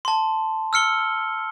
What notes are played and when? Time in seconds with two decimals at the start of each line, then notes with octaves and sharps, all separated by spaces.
0.05 A5 C6
0.73 E6 F6 C#7 G7